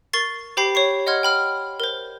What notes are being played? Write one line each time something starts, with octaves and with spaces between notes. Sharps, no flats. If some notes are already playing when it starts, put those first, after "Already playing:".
A#4 C#6 A6 C7
G4 C5 G5 B5 C7
C#5 C#6 C7
D#5 F#5 C6 F6 G#6
G5 B5 F6
A#4 C5